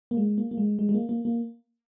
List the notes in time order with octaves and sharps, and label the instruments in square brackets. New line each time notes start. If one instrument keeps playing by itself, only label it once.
[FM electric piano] A#3
G#3
A#3
A#3
G#3
G#3
G#3
A#3
A#3
A#3